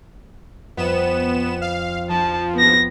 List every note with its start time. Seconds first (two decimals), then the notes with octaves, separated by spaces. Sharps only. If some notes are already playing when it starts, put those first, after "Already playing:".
0.77 F2 B3 E7
1.61 F5
2.09 F3 A5
2.55 B3 A#6